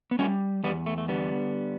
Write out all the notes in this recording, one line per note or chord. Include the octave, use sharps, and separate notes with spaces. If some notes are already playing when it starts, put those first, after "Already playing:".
B3
G3 A3 C#4
E2 G3 B3
A3
A3
D3 G3 B3